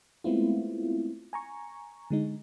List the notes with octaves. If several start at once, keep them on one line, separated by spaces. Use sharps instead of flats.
G#3 A3 B3 C4 E4 F4
G#5 A#5 C#6
D3 G#3 D#4